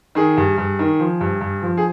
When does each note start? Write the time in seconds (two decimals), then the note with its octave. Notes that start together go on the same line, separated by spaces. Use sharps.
0.15 D#3 G#4
0.37 G2
0.58 G2
0.79 D#3
0.99 F3
1.21 G2
1.41 G2
1.62 F3
1.77 G#4